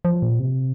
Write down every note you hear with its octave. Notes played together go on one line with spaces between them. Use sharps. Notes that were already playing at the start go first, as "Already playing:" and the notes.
F3
A#2
C3